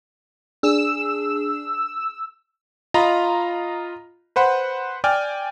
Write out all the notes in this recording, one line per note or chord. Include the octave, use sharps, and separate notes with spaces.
D4 G#4 E6
F4 D#5 A#5 B5
B4 C5 F#5 B5
D5 G5 G#5 F6